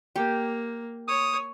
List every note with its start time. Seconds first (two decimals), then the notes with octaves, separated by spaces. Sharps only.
0.16 A#3 G4
1.08 C#5 D#6